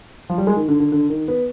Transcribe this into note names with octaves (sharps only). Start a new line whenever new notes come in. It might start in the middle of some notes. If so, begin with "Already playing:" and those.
F3
G3
G#3
D#3
D3
D3
D3
D#3
B3